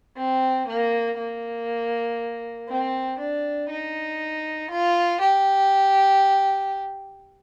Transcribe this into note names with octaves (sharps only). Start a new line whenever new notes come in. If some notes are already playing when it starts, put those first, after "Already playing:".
C4
A#3
A#3
C4
D4
D#4
F4
G4